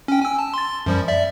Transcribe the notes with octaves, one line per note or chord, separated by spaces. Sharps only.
C#4 G5
G#5 E6
A5
C6 A6
F#2 F3 G3
D5 E5